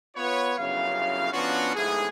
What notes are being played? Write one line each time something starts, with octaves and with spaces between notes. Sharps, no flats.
B3 F4 B4 C#5
G1 F#2 C#3 E4 F5
F3 B3 C#4 D4 F4 F#4
G1 G#2 A3 E4 G#4